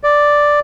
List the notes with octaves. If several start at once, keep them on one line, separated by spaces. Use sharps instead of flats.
D5